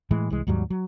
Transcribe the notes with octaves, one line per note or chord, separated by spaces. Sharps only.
A2 E3 G#3
C2 E3 G#3
D#2 G#2 F#3 G3
F#3